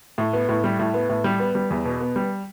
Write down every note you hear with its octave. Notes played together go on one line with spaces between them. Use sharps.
A2
B3
A2
G3
A2
B3
A2
G3
B3
G3
E2
B2
B3
G3